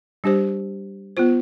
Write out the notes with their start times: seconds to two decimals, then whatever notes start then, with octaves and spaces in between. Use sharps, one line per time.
0.24 G3 D4 G4 C5
1.17 B3 F4 C5